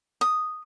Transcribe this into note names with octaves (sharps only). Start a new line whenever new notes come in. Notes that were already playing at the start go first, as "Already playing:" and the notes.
D#6